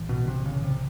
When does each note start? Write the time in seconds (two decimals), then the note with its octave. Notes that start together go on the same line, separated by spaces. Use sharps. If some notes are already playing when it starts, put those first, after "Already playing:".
Already playing: B1 A2 E3
0.09 B2
0.28 C3
0.46 C#3
0.64 C3